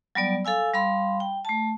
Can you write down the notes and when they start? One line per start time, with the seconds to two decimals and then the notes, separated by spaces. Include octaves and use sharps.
0.15 F#3 G3 B3 D5
0.45 A4 F5 G#5 E6
0.73 G3 F5 B5 C6
1.20 G5
1.45 A3 A5